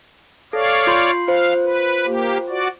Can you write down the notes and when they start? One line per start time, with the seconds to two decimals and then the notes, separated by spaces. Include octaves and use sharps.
0.53 A4 C#5 D5 F5
0.87 F4 C6 C7
1.28 F4 C5 F5
1.63 B4
2.06 A#3 G4
2.49 F#4 D5